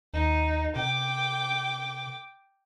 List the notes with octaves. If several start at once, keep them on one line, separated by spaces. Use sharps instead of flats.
D#2 D#4
C3 G5 D6